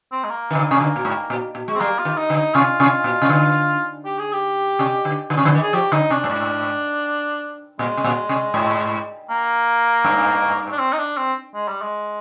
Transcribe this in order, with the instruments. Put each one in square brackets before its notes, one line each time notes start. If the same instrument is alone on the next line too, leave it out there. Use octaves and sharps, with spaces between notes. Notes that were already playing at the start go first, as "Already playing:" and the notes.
[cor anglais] C4
G#3
A#3
[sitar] D#3
D3
C3
D3
A#2
G#2
A#2
A#2
G#3
[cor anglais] C4
[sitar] G3 [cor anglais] A#3
[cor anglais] F4
[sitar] D#3
[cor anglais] D#4
[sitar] D3
[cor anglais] D#4
[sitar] C3 [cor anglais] F4
[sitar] C3
A#2
C3
D3
[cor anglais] G4
G#4
G4
[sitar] C3
D3
D3
C3
D3
D#3
[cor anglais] G#4
[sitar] F3 [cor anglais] G4
[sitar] D3 [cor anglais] D#4
[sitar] C3 [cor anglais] D4
[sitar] G2
[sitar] G#2 [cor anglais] D4
[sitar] A#2 [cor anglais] G#3
[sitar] C3
A#2
C3
G#2
[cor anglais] A#3
[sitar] G2
[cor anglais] D4
C4
D#4
D4
C4
G#3
G3
G#3